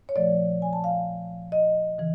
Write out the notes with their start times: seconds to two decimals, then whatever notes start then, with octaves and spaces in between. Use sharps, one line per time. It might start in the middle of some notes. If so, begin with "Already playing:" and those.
0.09 C#5
0.16 A#2 F3 A3 D5
0.62 G#5
0.73 A5
0.84 F5
1.52 D#5
1.98 C#3 E3